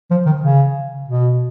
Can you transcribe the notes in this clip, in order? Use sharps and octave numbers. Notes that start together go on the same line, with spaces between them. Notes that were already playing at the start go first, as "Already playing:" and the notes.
F3
D#3
C#3
B2